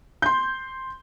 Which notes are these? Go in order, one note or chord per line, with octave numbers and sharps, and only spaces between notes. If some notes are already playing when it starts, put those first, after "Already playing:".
C6 G6